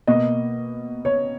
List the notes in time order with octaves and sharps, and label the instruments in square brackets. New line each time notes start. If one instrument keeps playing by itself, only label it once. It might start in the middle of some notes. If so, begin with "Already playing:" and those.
[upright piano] B2 A#3 D#5
C#5